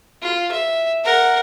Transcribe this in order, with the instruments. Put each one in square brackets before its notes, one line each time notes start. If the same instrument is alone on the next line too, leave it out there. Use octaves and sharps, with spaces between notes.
[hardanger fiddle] F4
E5
A#4 F#5